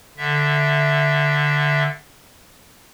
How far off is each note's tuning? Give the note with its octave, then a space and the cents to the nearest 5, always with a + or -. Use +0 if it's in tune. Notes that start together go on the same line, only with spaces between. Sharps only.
D3 +0 E5 +0